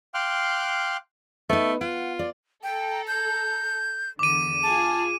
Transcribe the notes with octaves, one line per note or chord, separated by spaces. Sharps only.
F5 G5 C6 D6 F6 F#6
A3 B3 D#4
F4 F#5
D5
A4 G5 A#5
G6
E2 D3 D6 D#7
F4 G#4 G#5 A5